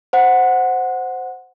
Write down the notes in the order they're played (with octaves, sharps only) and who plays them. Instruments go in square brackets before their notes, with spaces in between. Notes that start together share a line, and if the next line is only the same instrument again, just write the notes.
[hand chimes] C5 F#5